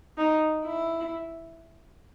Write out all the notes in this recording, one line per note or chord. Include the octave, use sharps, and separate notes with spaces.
D#4
E4